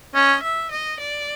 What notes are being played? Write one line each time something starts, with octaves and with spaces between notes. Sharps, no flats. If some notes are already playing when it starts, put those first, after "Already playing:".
C#4 D#5
E5
D#5
D5